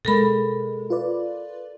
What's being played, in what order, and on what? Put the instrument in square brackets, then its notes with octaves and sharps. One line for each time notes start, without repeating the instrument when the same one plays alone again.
[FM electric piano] B2 G#3 [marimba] A4 A#4 B5
[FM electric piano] F4 B4 D5